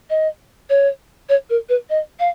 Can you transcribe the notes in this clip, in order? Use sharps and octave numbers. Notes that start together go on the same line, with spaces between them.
D#5
C#5
C#5
A#4
B4
D#5
F5